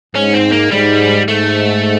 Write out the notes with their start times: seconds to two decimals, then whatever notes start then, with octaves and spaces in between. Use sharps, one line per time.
0.15 G#2 C#4
0.34 C4
0.52 A#3
0.71 G#2 G3
1.28 G#2 A3